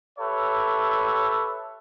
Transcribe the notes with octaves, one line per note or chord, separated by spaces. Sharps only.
G4 A4 B4 C#5 E5